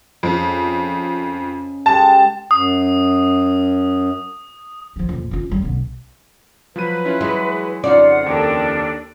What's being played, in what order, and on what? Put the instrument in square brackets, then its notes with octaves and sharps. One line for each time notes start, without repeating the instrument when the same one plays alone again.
[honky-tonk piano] F2 [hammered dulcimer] C#3 D#4
[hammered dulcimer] G#3 G4 A4 [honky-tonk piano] A5
[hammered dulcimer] G5
[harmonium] F#2 [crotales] D#6
[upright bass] F3 G3
A#1 F2
C#4 F4
F2 G3
B1 D3
[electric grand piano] F3 F#3 D#7 [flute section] B4
[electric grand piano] C#4 E4 F4
[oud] E3 G#3 [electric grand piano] F#3 E4 F#4
[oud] F2 C#3 D5 [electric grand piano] C#4 D#4 [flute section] F4 F#5
[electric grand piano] D#2 A#4 [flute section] D4 A4 G5